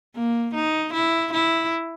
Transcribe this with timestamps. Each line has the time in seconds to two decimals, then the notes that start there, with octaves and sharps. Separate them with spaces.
0.15 A#3
0.55 D#4
0.93 E4
1.33 E4